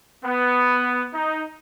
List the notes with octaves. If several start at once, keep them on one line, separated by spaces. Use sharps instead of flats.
B3
D#4